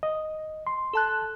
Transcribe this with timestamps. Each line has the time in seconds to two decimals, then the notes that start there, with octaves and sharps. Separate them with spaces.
0.03 D#5
0.67 C6
0.93 A4 A5 F#6